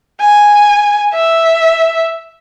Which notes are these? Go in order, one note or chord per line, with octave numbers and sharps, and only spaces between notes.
G#5
E5